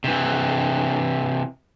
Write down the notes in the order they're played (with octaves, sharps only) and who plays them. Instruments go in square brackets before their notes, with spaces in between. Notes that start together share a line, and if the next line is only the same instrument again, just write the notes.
[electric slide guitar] C3 E3